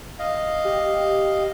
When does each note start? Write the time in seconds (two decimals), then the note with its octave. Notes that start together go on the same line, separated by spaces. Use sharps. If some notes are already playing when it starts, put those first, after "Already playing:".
0.19 D#5 F5
0.65 G4